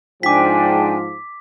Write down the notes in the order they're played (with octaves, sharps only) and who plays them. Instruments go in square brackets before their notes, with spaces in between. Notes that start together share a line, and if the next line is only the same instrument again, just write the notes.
[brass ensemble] G#2 F3 [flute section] D4 G5 G#5 [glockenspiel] D6 B6